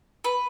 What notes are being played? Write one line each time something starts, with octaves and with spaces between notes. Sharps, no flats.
B4